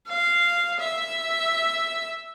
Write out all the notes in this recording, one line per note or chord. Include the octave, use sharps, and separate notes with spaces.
F5
E5